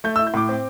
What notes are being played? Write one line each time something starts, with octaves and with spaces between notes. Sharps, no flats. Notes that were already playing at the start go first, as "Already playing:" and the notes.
A3 G6
E6
E4
G6
A2 D6
C4